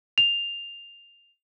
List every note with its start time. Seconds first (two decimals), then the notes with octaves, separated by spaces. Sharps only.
0.18 F7